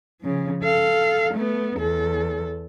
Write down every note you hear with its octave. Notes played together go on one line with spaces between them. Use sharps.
C#3 F3
A4 F5
A3 B3
E2 A4